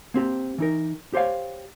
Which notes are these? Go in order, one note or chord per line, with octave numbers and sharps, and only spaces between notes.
A#3 C4 G4
E3 D#4 A#4
G4 C5 C#5 F5